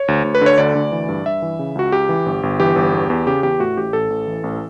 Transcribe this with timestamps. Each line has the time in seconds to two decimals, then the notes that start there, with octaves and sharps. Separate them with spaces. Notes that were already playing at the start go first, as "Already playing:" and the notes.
Already playing: C#5
0.08 D2
0.24 D2
0.35 B4
0.41 D3 C#5
0.58 D2 D5
0.75 D2
0.92 E3
1.09 G2
1.26 G2 E5
1.42 E3
1.59 C#3
1.75 C#2 F#4
1.92 C#2 G4
2.09 E3
2.26 G1
2.43 G1
2.60 E3 G4
2.76 G1
2.94 E2
3.10 E2
3.27 C#3 G4
3.43 E2 G4
3.60 A2 F#4
3.77 A1 G4
3.93 A1 A4
4.10 A1
4.27 E3
4.44 A1